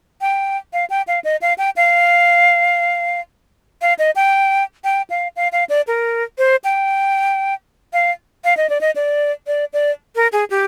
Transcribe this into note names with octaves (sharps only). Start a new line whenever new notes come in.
G5
F5
G5
F5
D#5
F5
G5
F5
F5
D#5
G5
G5
F5
F5
F5
D5
A#4
C5
G5
F5
F5
D#5
D5
D#5
D5
D5
D5
A#4
G#4
G4